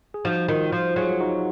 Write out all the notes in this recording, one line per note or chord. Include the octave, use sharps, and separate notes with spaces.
G#4
F3 D#4 F#4
D#3 F4
F3 F4
F#3 F4 G#4
D#4 F#4